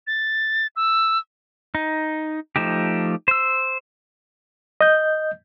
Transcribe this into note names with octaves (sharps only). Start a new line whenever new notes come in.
A6
E6
D#4
F3 A3 D#4 G4
C5 E6
D#5 G6